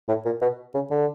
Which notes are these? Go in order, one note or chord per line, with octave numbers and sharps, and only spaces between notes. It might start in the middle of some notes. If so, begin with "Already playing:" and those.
A2
A#2
B2
C#3
D3